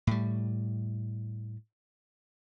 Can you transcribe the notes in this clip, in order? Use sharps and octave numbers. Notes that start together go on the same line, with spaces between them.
A2 G3